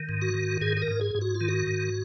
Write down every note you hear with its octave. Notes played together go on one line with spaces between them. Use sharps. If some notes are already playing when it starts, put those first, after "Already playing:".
Already playing: D#3
G#2
F#4
D#3
G#2 G#4
G#4
A#4
G#2
G#4
G#2
F#4
F4
D#3
F#4
G#2